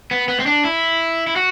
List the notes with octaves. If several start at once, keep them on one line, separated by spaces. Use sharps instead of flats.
B3
B3
C4
D4
E4
E4
F#4